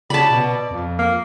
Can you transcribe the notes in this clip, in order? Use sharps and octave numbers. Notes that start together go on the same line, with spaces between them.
C#3 D5 A5 B5
B2
F2
A#3